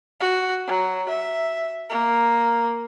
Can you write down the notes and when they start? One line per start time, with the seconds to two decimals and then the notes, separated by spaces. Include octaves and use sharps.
0.20 F#4
0.67 F#3
1.09 E5
1.90 A#3